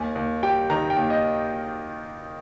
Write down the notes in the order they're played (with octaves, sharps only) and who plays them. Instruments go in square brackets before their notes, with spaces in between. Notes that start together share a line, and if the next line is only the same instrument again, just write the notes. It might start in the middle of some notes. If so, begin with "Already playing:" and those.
Already playing: [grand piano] D#2 G#5
D#2
G3 G5
D#3 A#5
G5
D#2
D#5